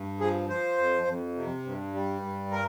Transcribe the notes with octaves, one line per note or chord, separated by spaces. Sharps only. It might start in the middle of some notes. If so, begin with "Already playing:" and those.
Already playing: G2
F3 G#4
F3 C5
F2
F2
C3
G2
G3
G2
A#4